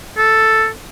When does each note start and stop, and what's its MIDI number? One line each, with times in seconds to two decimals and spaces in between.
0.17 0.68 69